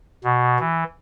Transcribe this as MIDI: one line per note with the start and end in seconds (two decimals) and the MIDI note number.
0.24 0.58 47
0.59 0.84 52